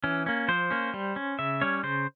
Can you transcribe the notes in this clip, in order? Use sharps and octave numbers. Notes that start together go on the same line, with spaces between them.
E3 C#4
A#3 C#4
F3 C5
A#3 C#4
G3
C#4
C#3 E5
G3 C#4 C#5
C#3 C5